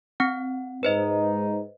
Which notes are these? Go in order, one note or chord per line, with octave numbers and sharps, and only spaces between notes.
C4 F#5
G#2 D#4 B4 C5 D#5